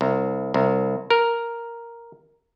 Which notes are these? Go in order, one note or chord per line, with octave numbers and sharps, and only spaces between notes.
C2
C2
A#4